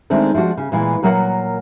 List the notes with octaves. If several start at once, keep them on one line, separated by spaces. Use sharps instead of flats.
D#3 G#3 A3 C4 D4
F3 G#3 D4 F#4
C#3
A#2 E3 G#3
A#2 F#3 A#3 A#4 F#5